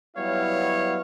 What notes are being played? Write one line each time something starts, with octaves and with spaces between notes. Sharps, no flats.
F#3 G3 B3 E4 C#5 F5